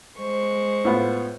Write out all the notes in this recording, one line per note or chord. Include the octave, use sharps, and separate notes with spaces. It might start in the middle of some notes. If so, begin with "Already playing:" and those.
G#3 C5 C#6
A2 B3 F4